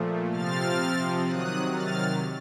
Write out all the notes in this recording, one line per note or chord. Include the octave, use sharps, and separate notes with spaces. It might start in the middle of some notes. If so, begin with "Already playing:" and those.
Already playing: A#2 F3 A3
C3 F3 C4 F6 A6
C3 D#3 F#3 D#6 F#6
F6 A6